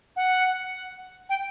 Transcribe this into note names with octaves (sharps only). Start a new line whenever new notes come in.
F#5
G5